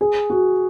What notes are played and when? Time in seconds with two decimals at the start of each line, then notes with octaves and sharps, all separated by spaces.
0.01 G#4
0.30 F#4